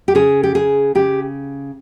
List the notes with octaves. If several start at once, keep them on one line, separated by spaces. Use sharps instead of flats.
G4
C#3 G#4
G4
C#3 G#4
C#3 G4